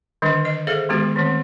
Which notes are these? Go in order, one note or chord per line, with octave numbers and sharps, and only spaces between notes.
D3 D#3 G3 D4
D#5
G#4 A4 C5 E5 F5
D#3 G#3 B3 C#4 F#4 G4
D#3 E3 A3 C4